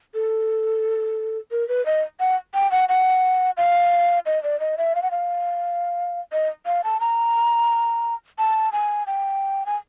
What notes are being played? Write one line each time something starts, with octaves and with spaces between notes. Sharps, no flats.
A4
A#4
B4
D#5
F#5
G5
F#5
F#5
F5
D#5
D5
D#5
E5
F5
F#5
F5
D#5
F5
A5
A#5
A5
G#5
G5
G#5